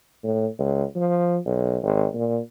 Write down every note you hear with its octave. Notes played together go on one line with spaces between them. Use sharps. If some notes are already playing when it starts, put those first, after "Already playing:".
A2
C#2
F3
B1
G#1
A#2